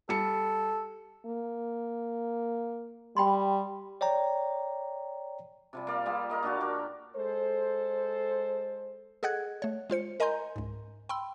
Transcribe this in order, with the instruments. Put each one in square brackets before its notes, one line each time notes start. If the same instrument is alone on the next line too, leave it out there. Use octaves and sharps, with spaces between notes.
[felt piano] G3 C#7 [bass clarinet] A4
[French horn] A#3
[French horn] G3 [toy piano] G5 B5 C6
[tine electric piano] C#5 D5 G5 A#5
[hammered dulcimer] C3 F3 G3
A#3 D5 F5
G3 A#3 F4 G#4
A#4 D#5 A#5
A#2 D4 F#4 A5
G4 A#4 D5
[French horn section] G#3 A4 C5
[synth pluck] G#4 A4 D#5 F#5 F#6 G#6
A3 C#5
G#3 F4 C5 C#7
A#4 D#5 G#5 A#5 C6 G6
C#2 G#2
G5 B5 C6 E6